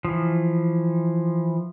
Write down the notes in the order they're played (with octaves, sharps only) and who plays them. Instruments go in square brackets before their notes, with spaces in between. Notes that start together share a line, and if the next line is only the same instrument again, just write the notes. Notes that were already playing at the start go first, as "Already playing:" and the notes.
[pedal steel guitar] E3 F3